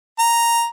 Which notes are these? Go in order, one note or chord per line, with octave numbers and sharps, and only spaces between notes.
A#5